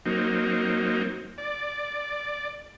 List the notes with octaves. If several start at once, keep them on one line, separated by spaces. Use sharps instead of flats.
F#3 A#3 C4 D#4
D5